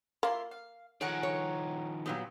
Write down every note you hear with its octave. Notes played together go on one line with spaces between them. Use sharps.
A#3 E4 F4 C6
F5
D#3 F3 G#4 A#4 C#5 F#5
C#5
A#2 F#3 B3 G4 B4